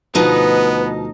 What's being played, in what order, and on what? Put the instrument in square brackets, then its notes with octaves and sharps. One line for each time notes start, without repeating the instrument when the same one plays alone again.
[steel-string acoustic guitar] D2 D#4 D#5 [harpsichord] B2 F3 [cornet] B3 [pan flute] B4